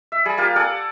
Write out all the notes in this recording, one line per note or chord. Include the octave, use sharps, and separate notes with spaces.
E5
G3 G#4 B5
A#3 F4 G4
A4 D5 F#5 G#5